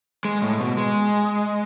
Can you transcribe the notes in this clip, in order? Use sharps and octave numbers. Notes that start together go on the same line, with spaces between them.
G#3
A2
B2
G#3